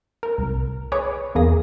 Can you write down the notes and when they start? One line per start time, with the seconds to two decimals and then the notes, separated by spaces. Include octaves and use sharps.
0.23 A#4
0.38 C2
0.92 G#4 B4 C#5 D6
1.35 E2 A#3 G#4 A#6